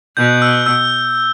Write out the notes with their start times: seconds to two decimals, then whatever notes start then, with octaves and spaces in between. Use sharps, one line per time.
0.17 B2 G6
0.42 E6
0.66 E6